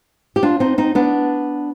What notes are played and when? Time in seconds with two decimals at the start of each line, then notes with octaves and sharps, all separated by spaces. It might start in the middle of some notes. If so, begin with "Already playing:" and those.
0.36 G4
0.43 D4 F4
0.60 C4 D#4
0.78 C4 D#4
0.95 B3 D4